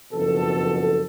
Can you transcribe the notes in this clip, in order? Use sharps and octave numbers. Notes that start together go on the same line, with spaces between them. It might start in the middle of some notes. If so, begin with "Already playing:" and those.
F#1 F2 B2 A4